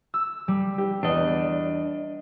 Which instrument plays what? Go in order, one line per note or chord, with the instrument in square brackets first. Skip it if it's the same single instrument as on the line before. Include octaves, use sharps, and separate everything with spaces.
[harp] E6
G3
[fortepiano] G4
[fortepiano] E2 [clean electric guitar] D4 D#5